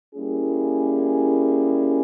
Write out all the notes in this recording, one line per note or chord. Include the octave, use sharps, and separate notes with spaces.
G3 A#3 C#4 E4 G#4